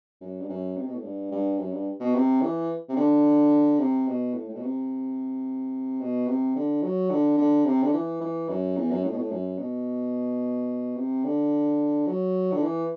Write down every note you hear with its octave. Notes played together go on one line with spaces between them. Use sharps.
F#2
G2
F#2
C3
B2
A2
G2
G2
F#2
G2
B2
C3
E3
C3
D3
C3
B2
A2
A2
B2
C3
B2
C3
D3
F#3
D3
D3
C3
D3
E3
E3
F#2
E2
F#2
A2
B2
A2
F#2
B2
C3
D3
F#3
D3
E3